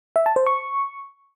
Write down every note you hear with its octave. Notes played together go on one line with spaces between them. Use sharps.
E5
A5
C5
C#6